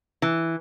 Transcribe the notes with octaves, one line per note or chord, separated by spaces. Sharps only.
E3